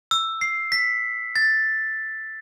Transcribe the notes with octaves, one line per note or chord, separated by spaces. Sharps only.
E6
C7
B6
A6